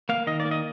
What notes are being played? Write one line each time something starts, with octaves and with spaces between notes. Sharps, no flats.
A#3 F5
D#3 D#5
D5
A#3
D#5